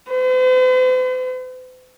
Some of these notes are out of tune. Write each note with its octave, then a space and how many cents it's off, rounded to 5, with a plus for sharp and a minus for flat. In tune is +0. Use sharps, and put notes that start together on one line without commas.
C5 -45